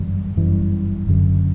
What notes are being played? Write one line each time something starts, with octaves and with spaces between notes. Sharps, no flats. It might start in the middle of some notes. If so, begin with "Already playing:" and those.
Already playing: G1 F#2 E3 G3
G1 F#2 E3 G3
F#1 F#2 D3